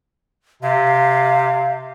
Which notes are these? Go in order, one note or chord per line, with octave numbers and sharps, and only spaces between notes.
C3 F5